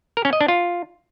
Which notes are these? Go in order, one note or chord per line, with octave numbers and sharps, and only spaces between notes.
A#4
C#4
D#5
D4
F4